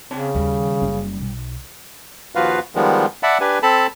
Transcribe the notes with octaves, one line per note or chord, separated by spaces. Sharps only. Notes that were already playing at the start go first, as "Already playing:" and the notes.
C#3 C4 C#5 A5
D#2 G3
F#1
B1
D#2 F3 F4 F#4 B4 F5
D#3 F3 G3 G#3 B3
D5 E5 F#5 A5 B5
D4 G4 B4 G#5
C4 A4 A5 B5